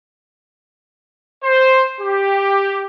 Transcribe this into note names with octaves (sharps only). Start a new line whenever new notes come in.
C5
G4